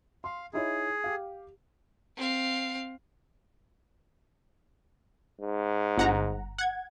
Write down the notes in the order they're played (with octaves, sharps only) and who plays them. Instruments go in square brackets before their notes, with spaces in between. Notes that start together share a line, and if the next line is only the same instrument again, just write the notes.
[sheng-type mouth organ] F5 [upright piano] C6
[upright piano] D#4 E4 C#5 [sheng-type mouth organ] G#4
[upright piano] G4 F5
[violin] C4 F5
[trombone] G#2
[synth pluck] G1 F#5 A#5
F#5 G#6